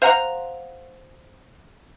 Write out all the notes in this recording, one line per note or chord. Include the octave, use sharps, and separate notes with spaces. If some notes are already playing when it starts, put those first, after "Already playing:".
C5 F5 F#5 A#5